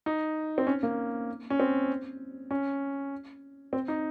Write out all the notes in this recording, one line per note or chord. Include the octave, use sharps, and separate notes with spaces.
D#4
C4
C#4
A#3
C#4
C4
C#4
C4
D#4